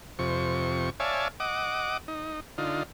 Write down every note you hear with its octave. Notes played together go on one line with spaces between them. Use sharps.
F2 C3 C#6
C#5 D5 E5 F5 G#5 A5
D#5 F#5 D6
D#4
D3 D#4 F4